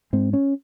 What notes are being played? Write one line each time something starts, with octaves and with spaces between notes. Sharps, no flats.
G#2 C4
C#4